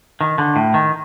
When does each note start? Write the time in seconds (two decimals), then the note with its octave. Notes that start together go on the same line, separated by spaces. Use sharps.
0.21 D#3
0.38 D3
0.56 A2
0.74 D#3